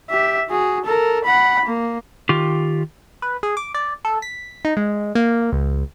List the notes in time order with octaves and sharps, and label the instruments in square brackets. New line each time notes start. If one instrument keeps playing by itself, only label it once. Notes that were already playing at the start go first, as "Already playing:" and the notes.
[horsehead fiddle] G4 E5
F#4 G#4
A4 A#4
F#5 B5
A#3
[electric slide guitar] D#3 F4 G4
[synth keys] B4
G#4
D6
D5
A4
B6
D#4
G#3
A#3
C#2